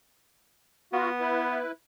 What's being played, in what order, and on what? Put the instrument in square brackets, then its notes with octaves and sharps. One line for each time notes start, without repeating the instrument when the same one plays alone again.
[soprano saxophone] B3 [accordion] F4 F#4
[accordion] E4 B4